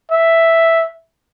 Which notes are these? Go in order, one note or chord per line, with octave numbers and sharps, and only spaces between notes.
E5